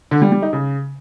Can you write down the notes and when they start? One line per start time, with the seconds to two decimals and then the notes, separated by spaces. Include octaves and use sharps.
0.11 D3
0.22 G3
0.32 G3
0.42 D#4
0.53 C#3